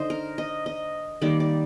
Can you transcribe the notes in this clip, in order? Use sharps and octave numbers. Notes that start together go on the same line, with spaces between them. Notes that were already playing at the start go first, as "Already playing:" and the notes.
Already playing: D3 D#4 C5 D#5
A#4
D#5
D#5
D#3 G3 A#3 D5
D5